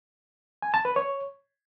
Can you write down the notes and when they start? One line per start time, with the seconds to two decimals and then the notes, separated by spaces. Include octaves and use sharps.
0.62 G#5
0.74 A5
0.85 B4
0.96 C#5